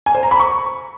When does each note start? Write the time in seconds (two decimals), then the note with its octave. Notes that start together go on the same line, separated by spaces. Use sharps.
0.06 G#5
0.15 C5
0.23 A#5
0.31 B5
0.39 C#6